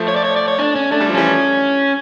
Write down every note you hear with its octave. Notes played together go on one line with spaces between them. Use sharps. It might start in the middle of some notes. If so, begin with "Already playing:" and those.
Already playing: F3 A3
C#5
D5
C#5
D5
C#5
D4
C#4
A3 D4
G3
F3
E3 G3 C#4